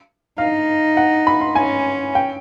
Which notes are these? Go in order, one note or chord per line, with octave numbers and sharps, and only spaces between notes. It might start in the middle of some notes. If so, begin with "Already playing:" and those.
D#4 F5
F#5
B5
C6
C#4 G#5
G5